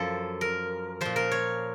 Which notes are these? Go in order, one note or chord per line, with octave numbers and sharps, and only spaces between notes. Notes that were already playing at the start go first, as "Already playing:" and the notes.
Already playing: F#2 F3 A4
A#4
A#2 F3 C5
A#4
C#5